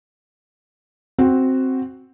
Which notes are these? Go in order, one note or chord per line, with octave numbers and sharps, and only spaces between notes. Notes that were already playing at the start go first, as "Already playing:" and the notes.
C4 F#4